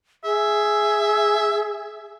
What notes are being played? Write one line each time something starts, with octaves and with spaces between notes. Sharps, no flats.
G#4 E5